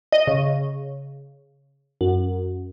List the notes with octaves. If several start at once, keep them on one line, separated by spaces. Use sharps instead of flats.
D#5
C#3
F#2